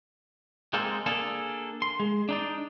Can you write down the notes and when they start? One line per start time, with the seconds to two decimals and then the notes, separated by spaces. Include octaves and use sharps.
0.74 G#3 A#3 C4 A4
1.06 A#3 D4 G#4 A4
1.82 C6
2.00 G#3
2.29 D4 D#4 D5